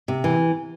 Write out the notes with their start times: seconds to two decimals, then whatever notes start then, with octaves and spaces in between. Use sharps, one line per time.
0.08 C3
0.24 E3